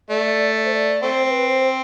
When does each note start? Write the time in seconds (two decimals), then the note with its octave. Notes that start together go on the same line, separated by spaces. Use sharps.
0.09 A3 D5
0.56 D5
0.65 C5
0.74 D5
1.02 A3 C4 C5
1.25 C5
1.30 B4
1.49 C5